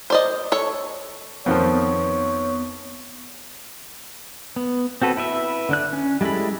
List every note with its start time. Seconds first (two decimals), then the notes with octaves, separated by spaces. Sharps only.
0.10 C5 D5 D#5
0.52 A4 C#5
1.46 F2 D#3 F3 B3 C#5
4.56 B3
5.02 C4 F#4 A4 B4
5.17 E4 B4 E5
5.69 D3 D4 F#6
5.93 C#4
6.21 G3 G#3 E4 A4 B5